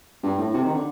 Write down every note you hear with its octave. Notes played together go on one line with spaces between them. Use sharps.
G2
A2
C3
D#3
D3